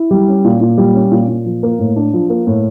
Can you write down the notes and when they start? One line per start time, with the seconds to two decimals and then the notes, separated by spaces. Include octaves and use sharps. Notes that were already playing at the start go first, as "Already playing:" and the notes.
Already playing: E4
0.11 G3
0.28 C#4
0.44 A#2
0.61 A#2
0.78 G3
0.95 C#4
1.11 A#2
1.28 A#2
1.45 F3
1.63 A#3
1.79 A2
1.96 D4
2.13 F3
2.30 A#3
2.47 A2